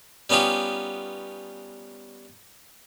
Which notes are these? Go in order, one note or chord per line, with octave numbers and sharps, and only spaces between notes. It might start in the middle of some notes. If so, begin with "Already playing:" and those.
G3 B3 C#4 D#4 F4 G4